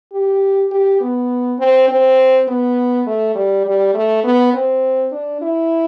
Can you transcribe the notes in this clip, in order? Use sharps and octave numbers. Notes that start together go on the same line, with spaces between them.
G4
G4
B3
C4
C4
B3
A3
G3
G3
A3
B3
C4
D4
E4